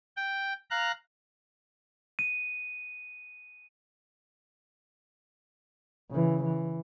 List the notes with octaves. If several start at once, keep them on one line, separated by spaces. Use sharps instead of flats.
G5
F5 A#5 F#6
D#7
C#3 E3
E3